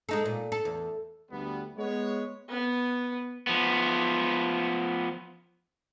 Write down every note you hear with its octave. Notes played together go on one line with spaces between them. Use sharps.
G#3 D#4 A4
A#2
A4
E2
D2 G3 B3
G#3 B3 C#5
B3
F3 B3